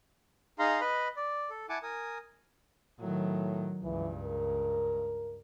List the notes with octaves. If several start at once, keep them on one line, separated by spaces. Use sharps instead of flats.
D#4 G#4 F5 A#5 C6
B4 D#5 B5
D5
A4
E4 F#5 G#5 A5 D6
A#4 G#5 D#6
A2 D#3 F#3
C#2 G2 E3
A#4